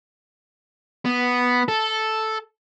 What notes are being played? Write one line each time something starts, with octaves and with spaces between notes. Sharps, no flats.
B3
A4